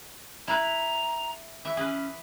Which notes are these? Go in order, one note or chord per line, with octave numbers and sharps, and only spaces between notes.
E4 B4 A#5
E3 E5
C#4 G#4 B4